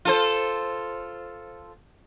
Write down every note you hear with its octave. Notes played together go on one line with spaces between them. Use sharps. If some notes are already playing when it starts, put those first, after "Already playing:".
F4 A4 C5